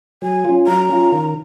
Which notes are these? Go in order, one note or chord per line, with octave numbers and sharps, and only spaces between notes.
F#3 G#5
C#4 F4
F#3 A#5
C#4 F4
D#3